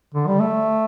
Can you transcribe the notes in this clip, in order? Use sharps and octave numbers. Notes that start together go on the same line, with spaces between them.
D3
G3
A3